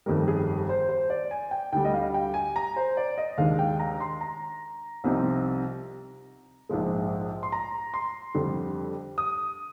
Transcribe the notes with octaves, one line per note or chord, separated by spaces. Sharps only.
G1 F2 D#3 G3 A#4
G#4
C5
C5
D5
G#5
G5
D2 D3 G3 G5
D#5
F5
G5
G#5
A#5
C5
D5
D#5
D#2 D#3 G#3 D4 F5
G5
A#5
C6
A#5
C2 C3 F3 C4 D#4
A#1 G#2 F3 G#3
C6
A#5
C6
F2 D3 G3
D#6